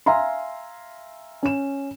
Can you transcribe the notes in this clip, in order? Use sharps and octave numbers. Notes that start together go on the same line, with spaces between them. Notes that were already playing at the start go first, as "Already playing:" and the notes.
E5 F5 G#5 A#5 C6
C#4 E7